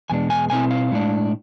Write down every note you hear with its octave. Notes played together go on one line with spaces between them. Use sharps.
E2 B2 G#3 D4 G#5
G#5
B2 A3 C4 E4 G#5
F5
A2 G#3 D4